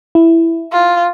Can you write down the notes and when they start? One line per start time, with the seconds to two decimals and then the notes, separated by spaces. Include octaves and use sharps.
0.15 E4
0.72 F4